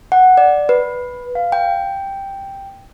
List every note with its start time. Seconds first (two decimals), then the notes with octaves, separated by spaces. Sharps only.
0.12 F#5
0.37 D5
0.69 B4
1.35 F5
1.52 G5